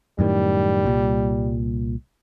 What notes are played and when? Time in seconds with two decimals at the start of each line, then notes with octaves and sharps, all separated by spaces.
0.19 F#2 A2 D#3 G3
0.84 C2 A#2